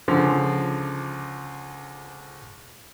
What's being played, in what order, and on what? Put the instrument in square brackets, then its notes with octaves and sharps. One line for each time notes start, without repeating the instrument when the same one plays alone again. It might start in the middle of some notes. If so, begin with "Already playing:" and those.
[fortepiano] C#2 D3 F3